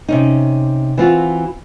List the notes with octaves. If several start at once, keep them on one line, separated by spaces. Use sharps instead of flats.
C3 C#4 D#4
E3 C4 F4 F#4